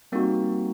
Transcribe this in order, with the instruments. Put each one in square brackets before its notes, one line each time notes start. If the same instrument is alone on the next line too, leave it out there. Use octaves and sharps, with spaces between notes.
[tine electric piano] G3 A#3 [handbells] C4 D#4 F#4